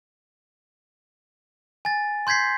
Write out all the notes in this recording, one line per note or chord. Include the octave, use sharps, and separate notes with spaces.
G#5 A6
C6 G6 G#6 B6 C7